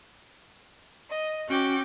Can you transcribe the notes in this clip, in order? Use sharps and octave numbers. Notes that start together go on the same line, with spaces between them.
D#5
C#4 F#4 G5 D6